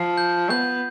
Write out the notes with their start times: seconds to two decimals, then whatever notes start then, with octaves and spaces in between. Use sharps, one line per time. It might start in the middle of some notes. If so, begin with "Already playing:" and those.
Already playing: F3 C7
0.18 G6
0.50 B3 G6